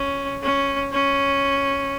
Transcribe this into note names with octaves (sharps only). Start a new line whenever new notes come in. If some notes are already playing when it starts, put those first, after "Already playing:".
Already playing: C#4
C#4
C#4